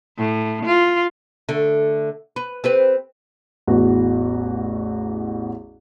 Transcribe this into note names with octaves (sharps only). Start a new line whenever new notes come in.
A2
F4
D3 A3
B4
C4 G4 B4
A1 E2 F#4